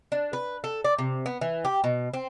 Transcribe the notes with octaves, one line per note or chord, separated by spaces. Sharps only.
D4
B4
A4
D5
C3
B3
E3
G4
B2
C4